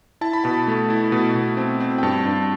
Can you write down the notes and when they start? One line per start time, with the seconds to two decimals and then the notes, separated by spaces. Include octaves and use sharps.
0.21 E4 A5
0.33 B5
0.44 B2 A5
0.67 A3
0.90 E4
1.12 B2
1.35 B2
1.57 C4
1.80 C4
1.98 G5
2.03 G2 A5
2.25 G2